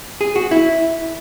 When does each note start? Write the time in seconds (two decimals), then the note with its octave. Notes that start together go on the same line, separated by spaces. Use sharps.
0.21 G#4
0.36 F#4
0.51 E4